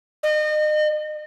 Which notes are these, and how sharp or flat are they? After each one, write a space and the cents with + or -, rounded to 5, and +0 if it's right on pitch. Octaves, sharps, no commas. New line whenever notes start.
D#5 -35